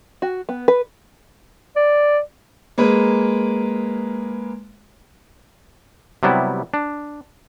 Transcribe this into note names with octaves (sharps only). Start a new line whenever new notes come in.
F#4
B3
B4
D5
G#3 A#3 B4
C3 F#3 G3 B3 E4
D4